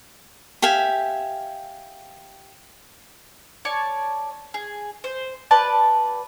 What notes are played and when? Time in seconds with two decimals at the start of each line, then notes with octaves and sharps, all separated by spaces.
0.62 G4 E5 F5 G#5
3.65 C#5 D5 A5
4.54 G#4
5.04 C5
5.51 G4 B4 D5 A5